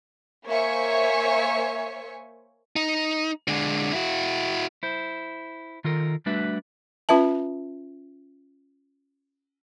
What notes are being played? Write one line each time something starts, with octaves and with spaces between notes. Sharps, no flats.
A#3 C5 C#5 E5 G#5 C#6
D#4
D3 G#3
E4 F#4
E4 C5
D#3 F4 A4 A#4
G3 A3 D4 F#4 B4 E5
C#4 F4 B4 E5 A5